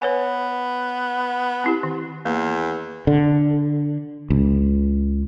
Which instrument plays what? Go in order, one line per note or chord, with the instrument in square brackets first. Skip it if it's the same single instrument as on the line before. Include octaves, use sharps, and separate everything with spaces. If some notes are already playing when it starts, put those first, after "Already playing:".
[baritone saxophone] B3 [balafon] B4 C#5 G#5
[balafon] C4 E4 G4
D#3
[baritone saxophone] E2 [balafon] A#3
[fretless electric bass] D3
C#2